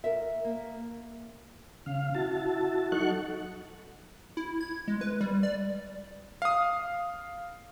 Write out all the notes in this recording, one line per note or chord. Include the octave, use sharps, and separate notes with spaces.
A#4 E5
A#3
C#3 F5
E4 F#4 A5
F#3 D#4 A4 F#5 C#6 F#6
E4
G#6
G#3
B4
G3
D5
F5 D#6